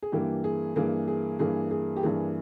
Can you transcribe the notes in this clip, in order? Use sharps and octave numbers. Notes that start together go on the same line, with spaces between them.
G#4
G2 E3 A#3 G4
G#4
G2 E3 A#3 G#4
G#4
G2 E3 A#3 G#4
G#4
G4
G2 E3 A#3 G#4